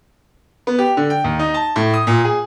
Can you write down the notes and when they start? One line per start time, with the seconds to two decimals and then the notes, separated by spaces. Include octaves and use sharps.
0.67 B3
0.79 G4
0.97 D3
1.10 G5
1.24 D#2
1.39 D#4
1.54 A5
1.76 A2
1.94 D#6
2.07 A#2
2.24 G#4